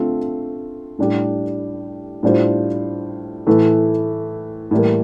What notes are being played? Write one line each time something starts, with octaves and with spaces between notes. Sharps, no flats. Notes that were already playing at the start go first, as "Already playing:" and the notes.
Already playing: D3 A3 C4 F4
A2 G3 D4 G4
A2 G3 D4 F4 C5
A2 E3 A3
A2 E3 G3 A#3